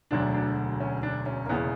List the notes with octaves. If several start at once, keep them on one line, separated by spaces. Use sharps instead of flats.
E1 D2 D3 F#3 D4
D4
C#4
D4
C#4
A#3
E1 E2 C#3 E3 B3